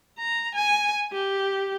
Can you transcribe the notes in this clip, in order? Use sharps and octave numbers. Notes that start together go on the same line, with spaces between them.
A#5
G#5
G4